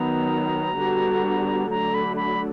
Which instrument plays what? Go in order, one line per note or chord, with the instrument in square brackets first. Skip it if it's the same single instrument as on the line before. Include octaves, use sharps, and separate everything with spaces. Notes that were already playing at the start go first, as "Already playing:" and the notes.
Already playing: [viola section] D#3 F#3 B3 [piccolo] A#5
[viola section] D3 G3 B3 D4 F#4
[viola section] D3 F#3 A3 D4 [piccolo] A#5
[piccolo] B5
B5